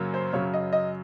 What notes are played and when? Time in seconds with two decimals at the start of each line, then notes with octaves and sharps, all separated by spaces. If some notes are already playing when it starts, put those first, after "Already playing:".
Already playing: F#2 C#3 F#3 A#3
0.14 C5
0.33 F#2 C#3 F#3 C#5
0.54 D#5
0.73 D#5